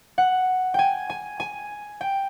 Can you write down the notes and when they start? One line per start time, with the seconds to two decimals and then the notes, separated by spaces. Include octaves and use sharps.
0.18 F#5
0.74 G5 G#5
1.10 G#5
1.40 G#5
2.01 G5